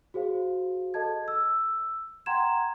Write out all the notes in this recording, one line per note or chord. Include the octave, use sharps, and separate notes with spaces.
F#4 G#4 C5 F5
A4 D#5 A5 G#6
E6
F#5 G5 A#5 C6 G#6 E7